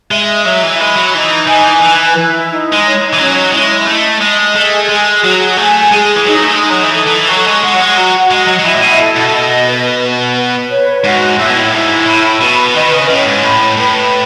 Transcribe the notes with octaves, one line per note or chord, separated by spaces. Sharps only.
G#3 E5
F#3 E5
E3
G#3 B5
F#3
E3 D#4
E3 G#5
E3 B4
E4
D#4
G#3
C#5
E3
F#3 C#4
G#3 E4
A3 D#5
G#3 D#5
A3 G#4
G#3 G#4
F#3 F#4
A3 G#5
G#3 G#4
E3
F#3 D#4
A3
G#3 D#4
F#3
E3
A4
E3
F#3 C#6
G#3
G#3 F#5
F#3
G#3
F#3 F#4
G#3 D#5
F#3
F#3
E3 E4
A2
B2
A4
B2
D#5
B4
B4
B4
C#5
G#2 F#4
A2 E4
B2
A2
G#2 E4
A2 B5
B2 B4
D#3 D#5
C#3
A2 C#4
G#2
A2 B5
A2 B4